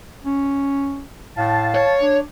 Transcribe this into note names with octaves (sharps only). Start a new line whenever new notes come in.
C#4
A2 F5 A5
C#5
D4